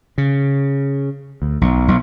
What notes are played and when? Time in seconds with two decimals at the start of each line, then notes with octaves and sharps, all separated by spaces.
0.18 C#3
1.42 D2
1.61 B1
1.88 B1